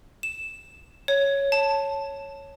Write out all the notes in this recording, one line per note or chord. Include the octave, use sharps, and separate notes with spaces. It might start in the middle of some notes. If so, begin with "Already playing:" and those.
E7
C#5
A5